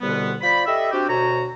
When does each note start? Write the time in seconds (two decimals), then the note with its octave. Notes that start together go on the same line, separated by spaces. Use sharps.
0.01 C2 B2 D3 G3 B3
0.42 F4 C5 D5 B5
0.66 G4 A4 D#5 E5
0.92 C4 D4 F#4 G4
1.09 D2 B2 F#4 C#5 A#5